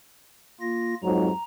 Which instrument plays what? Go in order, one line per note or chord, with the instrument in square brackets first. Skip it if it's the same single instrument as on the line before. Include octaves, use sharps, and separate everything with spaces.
[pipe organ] A#3 F4 A#6
[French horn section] F2 G#2 F#3 [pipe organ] A#5